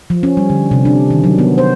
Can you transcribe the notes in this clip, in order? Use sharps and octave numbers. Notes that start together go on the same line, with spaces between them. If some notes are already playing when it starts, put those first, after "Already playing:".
F3
C#4
G3
D3
C3
D4
D#3
F#3
B3
C5